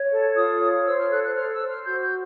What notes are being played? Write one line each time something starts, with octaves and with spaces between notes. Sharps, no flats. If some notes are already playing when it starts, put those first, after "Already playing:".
Already playing: C#5
A4
F4 D#6
C#5
C5 E6
F6
A4 F#6
F#6
C5 F6
E6
C5
F6
F#4 G6
G6